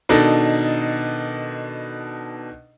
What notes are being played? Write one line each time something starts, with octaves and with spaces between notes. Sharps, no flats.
B2 D#3 D4 D#4 A4